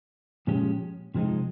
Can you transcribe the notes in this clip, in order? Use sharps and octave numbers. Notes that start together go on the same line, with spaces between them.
A#2 F3 G#3 C#4 G4
C3 F3 G#3 C4 D#4